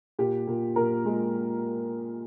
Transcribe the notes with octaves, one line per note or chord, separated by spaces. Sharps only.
A#2 G4
A#2
A#2 A#4
G#3